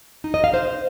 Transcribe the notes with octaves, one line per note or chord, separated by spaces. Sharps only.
D#4
D#5
F5
C5